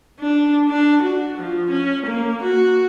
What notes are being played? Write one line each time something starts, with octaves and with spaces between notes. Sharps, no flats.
D4
D4
F#4
F3
C#4
A#3
F#4